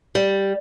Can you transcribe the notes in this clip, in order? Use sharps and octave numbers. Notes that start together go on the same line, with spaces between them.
G3